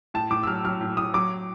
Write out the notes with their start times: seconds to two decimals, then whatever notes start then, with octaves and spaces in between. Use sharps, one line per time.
0.14 A2 A5
0.30 A2 D6
0.43 E6
0.47 F#3 F6
0.64 F#3 F6
0.81 A2
0.97 A2 D#6
1.14 F#3 D6